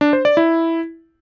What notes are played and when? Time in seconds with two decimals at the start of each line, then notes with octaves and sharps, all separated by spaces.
0.01 D4
0.13 C5
0.25 D5
0.37 E4